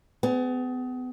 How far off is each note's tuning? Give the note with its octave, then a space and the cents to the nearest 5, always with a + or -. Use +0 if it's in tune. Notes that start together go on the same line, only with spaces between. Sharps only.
B3 +35 G#4 +0